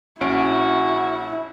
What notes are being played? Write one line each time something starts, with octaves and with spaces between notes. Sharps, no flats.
A#1 C#4 E4 F#4 D7